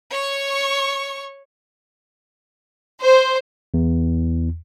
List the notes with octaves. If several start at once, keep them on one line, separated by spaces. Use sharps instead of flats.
C#5 C#6
C5
E2